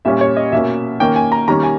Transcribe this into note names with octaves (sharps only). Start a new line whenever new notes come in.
A#2 G3 C#4 E5
C#5
D#5
B2 A#3 C#4 E5
D#3 A#3 C#4 G5
G#5
A#5
D#3 G3 A#3 C#4 A#5
G#5